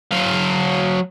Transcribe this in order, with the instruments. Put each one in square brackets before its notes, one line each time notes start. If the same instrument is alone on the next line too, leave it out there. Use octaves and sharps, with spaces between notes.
[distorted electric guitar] F#3 F5